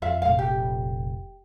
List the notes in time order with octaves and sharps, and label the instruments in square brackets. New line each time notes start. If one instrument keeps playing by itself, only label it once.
[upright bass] F2 [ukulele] F4 E5 F5
[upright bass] F1 A#1 [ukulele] F5
[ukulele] G4